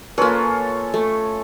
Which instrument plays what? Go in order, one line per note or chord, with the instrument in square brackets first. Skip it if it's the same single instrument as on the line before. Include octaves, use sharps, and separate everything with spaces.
[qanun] A#3 B4 [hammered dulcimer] C#4 F4 A4
[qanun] A3